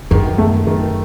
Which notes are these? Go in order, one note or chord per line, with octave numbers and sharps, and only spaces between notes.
F#2 D#3
A3
D#3